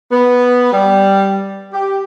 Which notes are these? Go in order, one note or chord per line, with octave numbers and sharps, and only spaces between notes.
B3
G3
G4